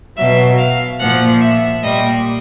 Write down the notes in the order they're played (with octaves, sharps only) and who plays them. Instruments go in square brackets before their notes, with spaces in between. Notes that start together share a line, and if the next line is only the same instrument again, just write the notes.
[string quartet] B2 F#3 E5
F5
A#2 F3 F#5
E5
A#2 G3 D#5